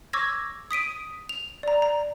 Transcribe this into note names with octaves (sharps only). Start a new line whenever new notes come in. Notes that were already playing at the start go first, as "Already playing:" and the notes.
C#6 D6 E6 G#6 A#6
D#6 B6 D7 D#7
F7
D5 A#5
A#5